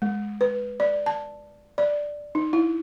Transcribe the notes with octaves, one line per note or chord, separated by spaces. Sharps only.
G#3
B4
D5
A5
D5
D#4
E4